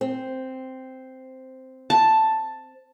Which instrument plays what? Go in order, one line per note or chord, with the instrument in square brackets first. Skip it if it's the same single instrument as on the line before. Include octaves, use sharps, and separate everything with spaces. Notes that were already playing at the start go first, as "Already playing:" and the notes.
[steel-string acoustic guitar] C4
[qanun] A5